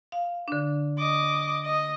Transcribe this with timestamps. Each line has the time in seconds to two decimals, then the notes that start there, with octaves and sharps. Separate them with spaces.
0.12 F5
0.48 D3 D4
0.99 D#5 D6
1.65 D#5